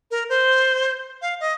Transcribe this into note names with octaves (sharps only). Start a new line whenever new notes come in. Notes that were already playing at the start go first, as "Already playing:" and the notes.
A#4
C5
F5
D#5